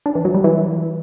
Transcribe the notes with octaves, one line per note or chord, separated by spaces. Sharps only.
D4
E3
F#3
G3
E3